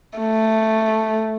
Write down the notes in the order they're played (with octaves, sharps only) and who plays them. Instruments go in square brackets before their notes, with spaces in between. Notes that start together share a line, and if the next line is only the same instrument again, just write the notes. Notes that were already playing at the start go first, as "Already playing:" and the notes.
[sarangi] A3